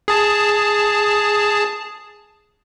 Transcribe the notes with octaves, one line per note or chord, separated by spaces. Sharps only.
G#4 A5